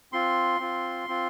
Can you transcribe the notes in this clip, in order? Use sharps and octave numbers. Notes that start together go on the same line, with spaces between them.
C4 F4 C6
C4 F4
C4 F4